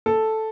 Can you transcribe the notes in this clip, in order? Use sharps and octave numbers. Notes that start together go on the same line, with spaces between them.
A4